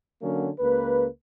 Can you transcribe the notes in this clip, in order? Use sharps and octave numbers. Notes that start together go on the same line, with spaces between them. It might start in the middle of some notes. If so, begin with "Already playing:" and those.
D3 F#3 A#3 C#4
C#2 A#3 B4